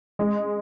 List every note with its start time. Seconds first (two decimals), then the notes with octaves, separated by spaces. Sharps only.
0.19 G#3